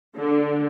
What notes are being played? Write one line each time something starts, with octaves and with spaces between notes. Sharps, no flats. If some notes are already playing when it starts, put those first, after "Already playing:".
D3